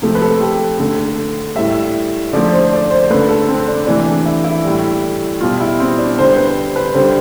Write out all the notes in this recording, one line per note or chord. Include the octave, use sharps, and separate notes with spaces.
C3 F3 A3
B4
A4
G4
D3 A3
A2 G3 E5
D3 F3 A3 D5
C5
D5
C5
D3 A3 B4
A4
C4
D4
C3 E3 A3 D4
D4
E4
E4
A2 G3
B2 G3 F4
E4
C4
D4
D3 G3 C5
B4
B4
D3 G3 C5